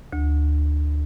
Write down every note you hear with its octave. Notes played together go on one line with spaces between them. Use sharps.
D2